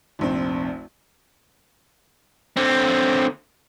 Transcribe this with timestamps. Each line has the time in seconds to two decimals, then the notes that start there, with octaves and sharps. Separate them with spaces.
0.19 F1 A#1 C4
2.57 D3 C4